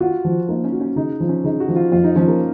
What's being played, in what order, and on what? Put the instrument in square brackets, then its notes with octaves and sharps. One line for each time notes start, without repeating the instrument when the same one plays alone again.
[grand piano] F4 [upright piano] F#4
[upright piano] F3
[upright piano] A#3 [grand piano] D#4
[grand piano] C#4
[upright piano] F#4
[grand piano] C#4
[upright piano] C#3 [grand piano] D#4
[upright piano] F3
[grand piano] C#4
[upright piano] C#3 [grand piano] D#4
[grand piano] F#4
[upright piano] F3
[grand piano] F4
[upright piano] F2 [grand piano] F4
[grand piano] D#4
[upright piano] F3 [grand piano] C#4
[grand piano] A#3